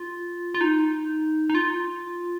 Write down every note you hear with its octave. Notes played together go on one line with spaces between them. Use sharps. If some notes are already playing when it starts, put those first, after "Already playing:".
Already playing: F4
F4
D#4
D#4
F4